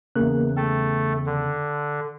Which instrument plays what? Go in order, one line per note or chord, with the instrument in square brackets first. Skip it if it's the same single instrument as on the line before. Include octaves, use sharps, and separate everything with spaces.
[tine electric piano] E2 C#3 [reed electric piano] A#3 A#4 F#6
[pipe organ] A3 A4 [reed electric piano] G5
[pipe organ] D3